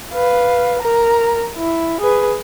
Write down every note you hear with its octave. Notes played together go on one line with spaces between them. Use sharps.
B4 F5
A#4 A#5
E4
G#4 B4